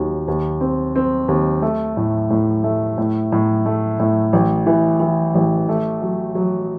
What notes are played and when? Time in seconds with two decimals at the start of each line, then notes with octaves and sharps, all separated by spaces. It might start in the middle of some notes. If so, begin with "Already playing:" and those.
Already playing: D#2 D#3 F#3
0.28 D#2
0.61 C4
0.95 C4
1.28 D#2
1.62 A3
1.97 A2
2.30 A2
2.64 A3
2.98 A2
3.32 A2
3.66 A3
4.00 A2
4.33 A1
4.66 E3
5.00 E3
5.35 A1
5.69 A3
6.02 F#3
6.35 F#3